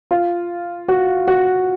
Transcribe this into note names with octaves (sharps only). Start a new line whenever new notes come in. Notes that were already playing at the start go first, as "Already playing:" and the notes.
F4
F#4
F#4